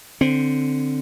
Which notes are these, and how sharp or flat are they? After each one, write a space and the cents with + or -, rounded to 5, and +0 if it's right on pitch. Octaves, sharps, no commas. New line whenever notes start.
D3 +5 C4 +0